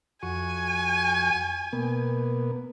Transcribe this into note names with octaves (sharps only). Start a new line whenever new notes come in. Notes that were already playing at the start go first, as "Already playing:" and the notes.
F2 F#4 G#5 C#6
B2 A#3 B3